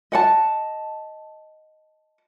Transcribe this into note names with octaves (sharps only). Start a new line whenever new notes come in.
D#5 F#5 A5